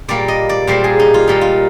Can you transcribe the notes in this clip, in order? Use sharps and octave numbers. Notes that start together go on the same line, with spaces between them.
A#2 G3 A#3 D5
D#5
D5
A#2 G3 A#3 C5
G#4
D#4
F4
A#2 G3 A#3 D#4
F4